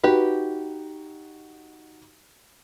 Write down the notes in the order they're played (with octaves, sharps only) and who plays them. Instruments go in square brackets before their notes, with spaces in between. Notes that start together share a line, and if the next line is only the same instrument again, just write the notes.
[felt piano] D#4 F#4 [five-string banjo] G4 B4